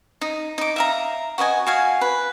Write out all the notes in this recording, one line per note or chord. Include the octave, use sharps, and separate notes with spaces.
D#4
D#4 D6
E5 F5 A#5
F#4 B4 D#5 G#5
F#4 F5 G#5
B4